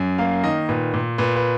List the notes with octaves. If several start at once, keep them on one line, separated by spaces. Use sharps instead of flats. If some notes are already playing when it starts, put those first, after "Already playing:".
Already playing: F#2
A#3 F5
D#3 D#5
A#2 B4
A#2
A#2 B4
B4